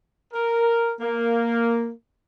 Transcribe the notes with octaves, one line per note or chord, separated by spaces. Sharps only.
A#4
A#3